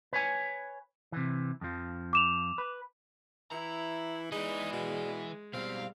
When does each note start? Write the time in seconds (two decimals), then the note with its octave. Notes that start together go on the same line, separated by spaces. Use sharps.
0.13 B4 C#5 G#5
1.12 C3 E3
1.61 F2 F3
2.13 D6 E7 F7
2.58 B4
3.51 E3 E4 A#5
4.32 E3 G#3 D#4 G#4 B4 D5
4.73 B2
5.54 B2 G3 C4 F5